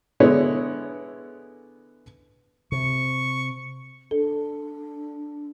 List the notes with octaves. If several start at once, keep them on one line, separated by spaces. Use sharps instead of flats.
D3 G#3 B3 E4 C#5
C3 C#6
D4 A4